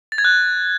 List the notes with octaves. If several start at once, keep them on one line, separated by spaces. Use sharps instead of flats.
A6
G#6
F#6